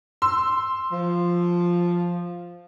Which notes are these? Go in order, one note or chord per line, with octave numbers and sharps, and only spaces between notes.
C6 E6
F3